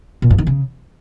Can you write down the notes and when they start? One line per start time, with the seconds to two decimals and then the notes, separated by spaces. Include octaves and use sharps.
0.22 A#2
0.30 G2
0.38 D#3
0.47 C#3